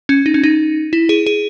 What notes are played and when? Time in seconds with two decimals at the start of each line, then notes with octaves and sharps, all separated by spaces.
0.09 C#4
0.26 D#4
0.34 C#4
0.43 D#4
0.93 E4
1.09 G#4
1.26 G#4